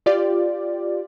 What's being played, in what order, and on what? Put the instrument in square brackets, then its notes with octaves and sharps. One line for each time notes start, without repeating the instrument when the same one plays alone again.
[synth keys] F4 G4 D5